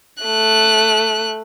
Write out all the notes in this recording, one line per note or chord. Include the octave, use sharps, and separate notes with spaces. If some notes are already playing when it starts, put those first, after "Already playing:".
A3 F#6